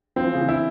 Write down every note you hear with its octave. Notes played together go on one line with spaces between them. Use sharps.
F3 C4
E3
C#3
E3
E4